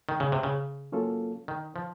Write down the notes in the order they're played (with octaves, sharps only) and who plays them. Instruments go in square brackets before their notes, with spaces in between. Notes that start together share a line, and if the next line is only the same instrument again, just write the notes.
[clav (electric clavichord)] D#3
C#3
C3
C#3
[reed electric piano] F#3 A#3 C#4 F4 A4
[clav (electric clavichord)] D#3
F3